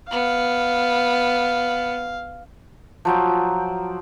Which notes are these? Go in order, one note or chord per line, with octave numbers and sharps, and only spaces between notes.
B3 F5
F3 F#3 G5